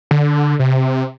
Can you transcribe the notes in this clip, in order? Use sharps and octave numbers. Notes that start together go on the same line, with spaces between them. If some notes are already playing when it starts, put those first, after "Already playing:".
D3
C3